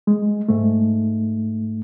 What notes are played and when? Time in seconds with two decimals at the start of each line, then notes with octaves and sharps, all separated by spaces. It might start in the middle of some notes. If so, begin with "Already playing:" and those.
0.07 G#3
0.48 G#2 A3